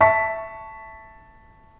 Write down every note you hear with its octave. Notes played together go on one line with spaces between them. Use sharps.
E5 A5 C#6 B6